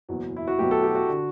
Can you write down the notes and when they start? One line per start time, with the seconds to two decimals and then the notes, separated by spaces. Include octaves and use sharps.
0.09 F#1 E2 B2 F#3 B3
0.36 E4
0.47 F#4
0.58 B2 F#3 A3 G4
0.71 A4
0.83 G4
0.95 F#4
1.08 D3